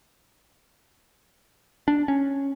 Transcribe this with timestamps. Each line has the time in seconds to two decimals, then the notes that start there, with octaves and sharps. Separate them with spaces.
1.88 D4
2.08 C#4